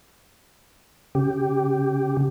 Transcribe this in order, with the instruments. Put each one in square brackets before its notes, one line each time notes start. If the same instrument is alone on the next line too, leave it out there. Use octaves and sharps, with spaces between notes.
[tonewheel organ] C#3 G4